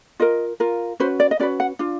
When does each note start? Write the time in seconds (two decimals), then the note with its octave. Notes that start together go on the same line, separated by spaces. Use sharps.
0.20 F4 A#4 D#5
0.60 F4 A#4
1.00 C#4 F#4 B4 C5
1.20 D5
1.31 D#5
1.39 C#4 F#4 B4 D5
1.60 F#5
1.79 D4 F4